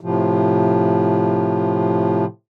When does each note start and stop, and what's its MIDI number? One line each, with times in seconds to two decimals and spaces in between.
0.01 2.25 45
0.01 2.25 48
0.01 2.25 53